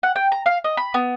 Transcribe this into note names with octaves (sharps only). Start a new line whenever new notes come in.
F#5
G5
A#5
F5
D#5
B5
B3